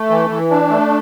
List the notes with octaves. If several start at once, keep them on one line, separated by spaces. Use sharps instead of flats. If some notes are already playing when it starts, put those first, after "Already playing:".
Already playing: A3
E3
E3
D4
A3